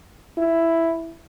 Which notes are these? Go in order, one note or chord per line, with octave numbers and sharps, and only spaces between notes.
E4